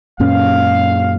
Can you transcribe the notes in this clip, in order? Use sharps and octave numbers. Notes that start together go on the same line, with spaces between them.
F#2 A#2 C#4 F5